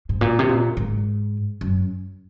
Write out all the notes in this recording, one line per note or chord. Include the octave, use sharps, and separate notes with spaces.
G#2
A#2
C3
A#2
G#2
F#2